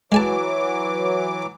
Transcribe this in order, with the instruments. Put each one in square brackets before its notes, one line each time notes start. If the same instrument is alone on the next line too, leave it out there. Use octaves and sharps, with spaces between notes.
[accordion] E3 F#3 D6 [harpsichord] G#3 G#5 A5